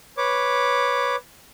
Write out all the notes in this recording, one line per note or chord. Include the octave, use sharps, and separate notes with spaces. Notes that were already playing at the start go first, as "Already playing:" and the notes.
B4 C#5 D6